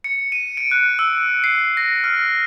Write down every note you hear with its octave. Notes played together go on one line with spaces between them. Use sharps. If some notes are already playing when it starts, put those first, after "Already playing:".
C#7
D#7
D7
F#6
E6
C7
A#6
F6